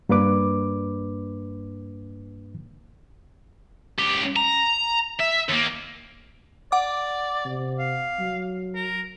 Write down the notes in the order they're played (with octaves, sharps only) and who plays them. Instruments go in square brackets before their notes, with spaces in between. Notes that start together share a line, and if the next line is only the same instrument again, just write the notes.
[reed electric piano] G2 A#3 D4 B4 D6
[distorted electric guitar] C#2 G4
A#5
E5
D#2 A#3
[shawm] D5 [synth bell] F#5 D6
[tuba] C3
[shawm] F5
[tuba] F#3
[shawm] A#4